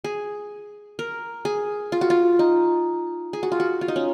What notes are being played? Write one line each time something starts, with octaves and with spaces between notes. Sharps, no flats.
G#4
A#4
G#4
F4
F#4
F4
D#4
G#4
F#4
F4
F#4
F4
D#4
C#4